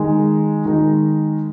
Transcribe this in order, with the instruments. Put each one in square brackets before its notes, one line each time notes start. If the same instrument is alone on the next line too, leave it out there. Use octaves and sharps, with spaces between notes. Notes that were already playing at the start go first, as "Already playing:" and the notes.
Already playing: [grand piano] D#3 G#3 D#4
D#3 G#3 D#4